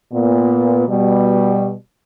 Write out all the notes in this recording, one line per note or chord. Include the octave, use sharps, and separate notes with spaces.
A#2 B3
B2 G3